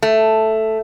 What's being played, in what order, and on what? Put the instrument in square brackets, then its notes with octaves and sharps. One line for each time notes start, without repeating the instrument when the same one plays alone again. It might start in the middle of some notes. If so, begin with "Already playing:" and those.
[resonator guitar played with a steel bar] A3